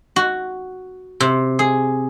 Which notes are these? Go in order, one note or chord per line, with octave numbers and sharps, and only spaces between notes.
F#4
C3
G#4